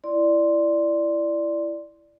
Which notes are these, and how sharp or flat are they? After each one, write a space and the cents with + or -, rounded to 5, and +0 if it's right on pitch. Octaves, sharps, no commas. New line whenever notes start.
E4 +20 D5 +0 C6 +0